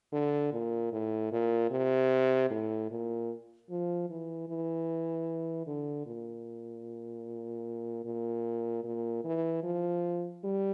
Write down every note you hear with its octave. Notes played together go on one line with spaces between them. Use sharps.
D3
A#2
A2
A#2
C3
A2
A#2
F3
E3
E3
D3
A#2
A#2
A#2
E3
F3
G3